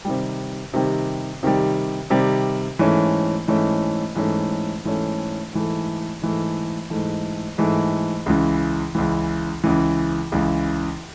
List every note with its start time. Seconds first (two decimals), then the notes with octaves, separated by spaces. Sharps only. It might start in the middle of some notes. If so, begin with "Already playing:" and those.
0.05 C3 D#3 G3
0.73 C3 D#3 G3
1.43 C3 D#3 G3
2.10 C3 D#3 G3
2.79 G#2 E3 A3 C#4
3.47 G#2 E3 A3 C#4
4.15 G#2 E3 A3 C#4
4.84 G#2 E3 A3 C#4
5.53 G#2 E3 A3
6.22 G#2 E3 A3
6.90 G#2 E3 A3
7.58 G#2 E3 A3
8.26 C#2 C#3 E3
8.95 C#2 C#3 E3
9.64 C#2 C#3 E3
10.32 C#2 C#3 E3